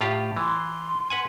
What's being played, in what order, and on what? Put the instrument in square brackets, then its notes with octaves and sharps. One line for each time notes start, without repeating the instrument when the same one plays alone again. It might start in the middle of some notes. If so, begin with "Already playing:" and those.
[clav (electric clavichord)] A2 F4 G4
[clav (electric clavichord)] E3 [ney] C6
[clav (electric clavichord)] B4 F#5 G#5